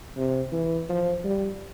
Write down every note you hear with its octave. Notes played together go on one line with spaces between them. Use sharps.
C3
E3
F3
G3